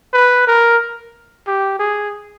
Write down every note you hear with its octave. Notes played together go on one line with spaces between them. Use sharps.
B4
A#4
G4
G#4